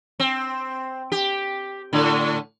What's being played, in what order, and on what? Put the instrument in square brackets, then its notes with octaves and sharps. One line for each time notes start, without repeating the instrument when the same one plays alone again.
[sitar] C4
G4
A2 D3